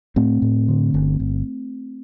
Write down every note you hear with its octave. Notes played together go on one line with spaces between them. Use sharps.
A2 A3 C4
A2
D3
G1
G1